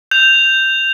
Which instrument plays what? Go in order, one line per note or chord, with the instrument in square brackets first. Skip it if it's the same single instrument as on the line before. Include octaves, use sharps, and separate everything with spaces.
[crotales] G6 F7